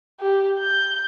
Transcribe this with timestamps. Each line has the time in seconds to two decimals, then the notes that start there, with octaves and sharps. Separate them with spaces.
0.20 G4
0.60 G6